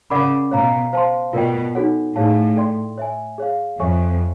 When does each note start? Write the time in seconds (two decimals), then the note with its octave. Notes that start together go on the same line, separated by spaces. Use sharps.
0.10 C#3 A#4 D5 F#5 B5 D6
0.51 B2 C#5 F5 A#5
0.93 C5 F5 A5 C6
1.33 B2 F4 A#4 D5 G5
1.75 D#4 F#4 A4 C#5 F#5
2.15 A2 D#4 G#4 C#5 F5 A5
2.56 A4 D5 G5 C6
2.98 C#5 E5 G#5
3.38 G#4 C#5 F5
3.79 F2 A4 C#5 E5 G#5 C#6